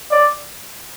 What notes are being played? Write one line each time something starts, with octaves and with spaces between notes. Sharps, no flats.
D5